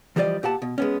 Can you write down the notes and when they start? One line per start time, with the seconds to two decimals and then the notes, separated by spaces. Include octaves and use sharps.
0.16 E3 F3 G3 B4 D5 D#5
0.43 A#2 G4 F#5 A5
0.62 B2
0.78 G#3 B3 C#4